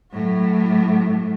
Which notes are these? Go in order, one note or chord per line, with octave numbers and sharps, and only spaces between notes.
A2 F#3